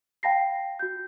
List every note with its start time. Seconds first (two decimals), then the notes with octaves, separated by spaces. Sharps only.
0.23 F5 G5 A5 B5 A#6 C7
0.79 F#4 G6